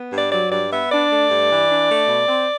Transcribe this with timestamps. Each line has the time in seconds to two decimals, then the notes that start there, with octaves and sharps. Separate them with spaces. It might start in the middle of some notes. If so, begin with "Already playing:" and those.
Already playing: B3
0.13 G2
0.18 D5
0.32 F#3 D5
0.51 G2 D5
0.72 B3 E5
0.91 D4 D5
1.11 A3
1.31 G2
1.50 E3
1.70 D4
1.89 A3
2.08 B2
2.28 C4